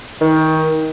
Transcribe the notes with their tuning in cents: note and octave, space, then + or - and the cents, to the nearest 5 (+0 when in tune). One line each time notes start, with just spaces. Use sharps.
D#3 +25